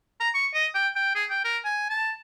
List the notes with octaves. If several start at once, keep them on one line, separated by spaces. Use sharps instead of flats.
A#5
C#6
D#5
G5
G5
G#4
G5
A#4
G#5
A5